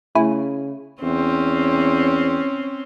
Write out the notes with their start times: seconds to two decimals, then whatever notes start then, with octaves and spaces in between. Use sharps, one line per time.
0.15 C#3 A3 E4 G#5
1.02 E2 C4 C#4